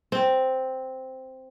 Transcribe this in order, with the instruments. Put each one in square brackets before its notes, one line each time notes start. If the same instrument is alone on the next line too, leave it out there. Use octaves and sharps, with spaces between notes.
[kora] C4